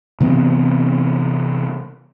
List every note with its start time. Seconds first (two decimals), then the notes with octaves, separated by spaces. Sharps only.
0.21 C3 E3 B3 C4